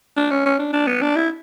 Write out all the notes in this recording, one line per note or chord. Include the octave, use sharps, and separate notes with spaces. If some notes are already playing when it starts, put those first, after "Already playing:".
D4
C#4
C#4
D4
D4
B3
D4
E4